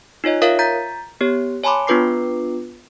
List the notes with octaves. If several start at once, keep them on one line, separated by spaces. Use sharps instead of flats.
D#4 F4 C#5 D#5
F4 A#4 C#5 E5 F5 D#6
A#5 G6 A6 B6
B3 G4 C#5
C#5 G#5 A5 B5 C6 D6
B3 D4 F4 B4 D6 C7